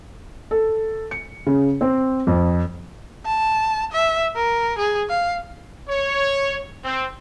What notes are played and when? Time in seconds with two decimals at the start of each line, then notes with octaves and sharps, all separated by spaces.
0.51 A4
1.11 C#7
1.47 C#3
1.81 C4
2.27 F2
3.26 A5
3.92 E5
4.36 A#4
4.78 G#4
5.09 F5
5.89 C#5
6.85 C4